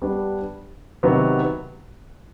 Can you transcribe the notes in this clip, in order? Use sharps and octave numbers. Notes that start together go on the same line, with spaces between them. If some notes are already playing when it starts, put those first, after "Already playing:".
G3 B3 D4
C3 D#3 F#3 B3